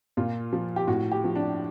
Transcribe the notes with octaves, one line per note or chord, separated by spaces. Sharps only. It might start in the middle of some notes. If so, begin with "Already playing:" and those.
A#2 F4
F3
G4
A2 F#4
G4
F3
D4